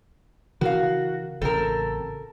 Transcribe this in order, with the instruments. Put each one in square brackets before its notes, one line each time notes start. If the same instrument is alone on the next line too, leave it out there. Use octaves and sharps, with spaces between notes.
[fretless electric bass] C#3 E3 [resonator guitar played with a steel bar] F#4 [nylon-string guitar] A#4 F5
[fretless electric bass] A1 C#3 [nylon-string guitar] C4 [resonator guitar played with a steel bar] A4 A#4